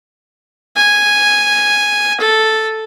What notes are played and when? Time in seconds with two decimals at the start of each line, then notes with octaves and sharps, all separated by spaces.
0.77 G#5
2.21 A4